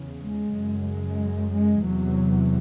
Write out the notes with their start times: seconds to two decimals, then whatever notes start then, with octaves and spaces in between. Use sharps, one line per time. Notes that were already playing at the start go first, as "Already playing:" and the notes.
Already playing: E2 C#3
0.21 G#3
0.53 F#2 C#3
0.87 G#3
1.53 G#3
1.86 E2 C3 F#3